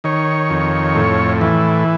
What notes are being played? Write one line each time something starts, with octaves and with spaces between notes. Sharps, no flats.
D#3 C#5
F2
A2
E3